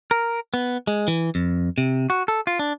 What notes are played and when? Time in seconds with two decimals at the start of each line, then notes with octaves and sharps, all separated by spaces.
0.11 A#4
0.54 B3
0.87 G#3
1.08 E3
1.35 F2
1.78 C3
2.10 F#4
2.28 A4
2.47 F4
2.59 D4